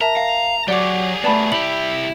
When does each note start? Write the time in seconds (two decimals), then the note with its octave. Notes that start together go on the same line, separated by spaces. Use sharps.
0.01 A#4 E5 A5 A#5
0.17 F5
0.68 F#3 G4 G#4 D5 F#5 D6
1.24 A3 B3 D5 A5 B5
1.52 C2 E4 G4 F#7